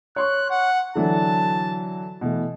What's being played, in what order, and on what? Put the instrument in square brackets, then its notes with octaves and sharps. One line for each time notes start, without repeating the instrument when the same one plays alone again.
[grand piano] C#5 C6 C#6 [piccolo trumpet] F#6
[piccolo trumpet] F#5
[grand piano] D3 E3 F#3 [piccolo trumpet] A5
[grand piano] B2 E3 A3